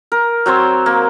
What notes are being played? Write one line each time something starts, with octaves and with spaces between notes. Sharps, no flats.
A#4
F#3 C4 C5 C#5
A#3